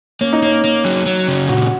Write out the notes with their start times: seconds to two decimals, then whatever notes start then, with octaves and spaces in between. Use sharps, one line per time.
0.21 A#3 C#4
0.33 D#4
0.43 A#3 C#4
0.64 A#3
0.85 F#3
1.06 F#3
1.28 C#3
1.49 A#2 F#4